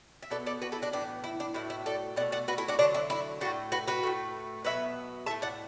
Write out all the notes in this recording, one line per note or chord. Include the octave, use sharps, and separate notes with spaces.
E5
B2 B3 A4 D5
A4 D5
F#4 B4
E4 A4
D4 F#4
A2 E3 B3 D4
E4
D4
A2 F#3 B3 E4
E4
A4 D5
B2 A3 D5 F#5
D5 F#5
F#4 B4
E4 A4
D4 F#4
D3 F#3 A3 D4
E4
E4
A2 A3 D4 F#4
F#4 B4
F#4 B4
A2 A3
B2 F#3 B3 B4 E5
A2 A3 E5 A5
D5 F#5